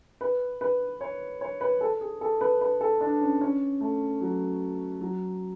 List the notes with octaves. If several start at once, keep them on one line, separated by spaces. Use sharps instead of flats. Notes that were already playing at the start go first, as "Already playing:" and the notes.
B4
B4
C#5
C#5
B4
A4
G#4
A4
B4
B4
A4
D4
C#4
C#4
A3
F#3
F#3